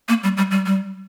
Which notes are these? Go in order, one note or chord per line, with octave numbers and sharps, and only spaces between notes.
A#3
G3
G3
G3
G3